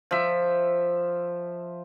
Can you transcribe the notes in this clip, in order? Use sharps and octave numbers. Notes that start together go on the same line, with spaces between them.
F3 E5